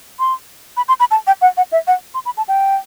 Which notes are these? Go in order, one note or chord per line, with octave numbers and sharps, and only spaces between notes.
C6
B5
C6
B5
A5
G5
F#5
F#5
E5
F#5
C6
B5
A5
G5